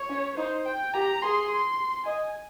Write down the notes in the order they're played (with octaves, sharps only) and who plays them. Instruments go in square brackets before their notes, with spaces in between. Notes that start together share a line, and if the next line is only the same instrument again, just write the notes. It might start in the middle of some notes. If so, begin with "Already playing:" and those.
Already playing: [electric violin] C#5
[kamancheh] C#4
[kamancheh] D#4 [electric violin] C5
[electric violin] G5
[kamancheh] G4 [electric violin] A#5
[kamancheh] G#4 [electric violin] C6
[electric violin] C6
[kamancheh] D#5 [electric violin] G#5